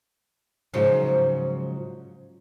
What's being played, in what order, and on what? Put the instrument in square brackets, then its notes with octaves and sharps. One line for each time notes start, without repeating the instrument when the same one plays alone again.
[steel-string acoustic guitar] G#2 C#3 F3 F#3